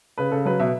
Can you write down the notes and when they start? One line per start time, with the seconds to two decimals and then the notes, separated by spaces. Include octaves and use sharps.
0.18 C#3 B4
0.31 C#3 A4
0.46 F#3 B4
0.60 B2 E5